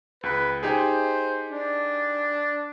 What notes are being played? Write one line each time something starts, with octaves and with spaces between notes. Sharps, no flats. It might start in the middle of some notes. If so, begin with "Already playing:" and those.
C#2 B4
D#4 G4 G#4 C5
D4